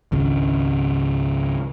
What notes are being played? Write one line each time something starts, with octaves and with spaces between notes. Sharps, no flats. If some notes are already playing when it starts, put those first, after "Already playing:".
G#1 C#2 C#3